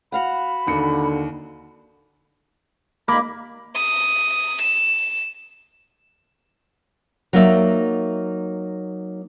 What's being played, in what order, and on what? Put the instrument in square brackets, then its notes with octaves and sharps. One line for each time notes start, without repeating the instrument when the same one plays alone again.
[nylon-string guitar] F#4 F5 F#5 [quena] B5
[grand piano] D#2 C#7 [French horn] D3
[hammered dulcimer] A#3 [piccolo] B5
[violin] D#6
E7
[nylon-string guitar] F#3 A#3 D#4 D5 E5